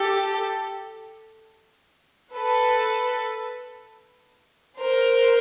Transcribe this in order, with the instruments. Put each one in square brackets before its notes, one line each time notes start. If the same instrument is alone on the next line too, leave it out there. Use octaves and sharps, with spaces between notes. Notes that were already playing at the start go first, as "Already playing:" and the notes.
Already playing: [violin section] G4 A4
A4 B4
A#4 C5